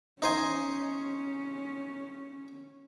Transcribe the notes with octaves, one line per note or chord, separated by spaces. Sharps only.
C#4 D#4 C5 G#5